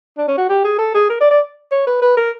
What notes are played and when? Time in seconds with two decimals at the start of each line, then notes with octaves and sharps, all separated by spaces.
0.18 D4
0.28 C#4
0.38 F#4
0.49 G4
0.64 G#4
0.78 A4
0.94 G#4
1.10 A#4
1.20 D5
1.31 D5
1.71 C#5
1.87 B4
2.02 B4
2.17 A#4